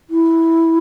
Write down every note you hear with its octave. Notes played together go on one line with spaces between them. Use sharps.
E4